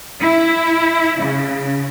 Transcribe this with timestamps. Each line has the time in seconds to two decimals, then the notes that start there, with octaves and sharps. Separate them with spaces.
0.21 E4
1.24 C#3